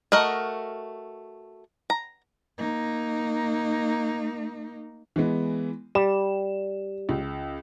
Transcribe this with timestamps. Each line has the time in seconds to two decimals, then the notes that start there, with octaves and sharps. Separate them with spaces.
0.12 A3 F#4 A#4 D#5
1.90 A#5
2.58 A#3 D#4
5.16 E3 G#3 B3
5.95 G3 E7
7.09 C#2